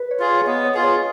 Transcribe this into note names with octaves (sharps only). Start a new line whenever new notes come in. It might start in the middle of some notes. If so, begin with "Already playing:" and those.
Already playing: B4
C#5
F4 G#4
C#5
C#5
B3 D#5
C#5
F4 G#4
C#5